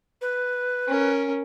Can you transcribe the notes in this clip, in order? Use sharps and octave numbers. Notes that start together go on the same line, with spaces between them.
B4
C#4 A#4